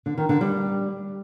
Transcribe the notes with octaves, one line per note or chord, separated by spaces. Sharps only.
D3
D#3
D3
G3